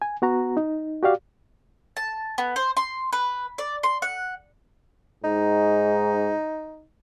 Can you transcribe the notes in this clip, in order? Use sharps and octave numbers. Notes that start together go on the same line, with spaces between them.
G#5
B3 F#4 A#5
D#4
F#4 G4 D5 F5
A5
B3
C5
C6
B4
D5
C6
F#5
G#2 D#4